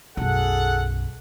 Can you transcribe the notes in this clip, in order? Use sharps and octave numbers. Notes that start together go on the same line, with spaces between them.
B1 F#2 G#4 A4 F#5